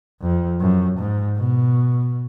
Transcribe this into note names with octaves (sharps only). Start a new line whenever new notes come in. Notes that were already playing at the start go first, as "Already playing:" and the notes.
F2
F#2
G#2
B2